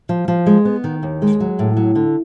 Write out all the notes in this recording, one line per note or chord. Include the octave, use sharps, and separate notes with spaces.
F3
F3
G#3
B3
D#3
D#2
G#3
F#3
A2
F#3
D3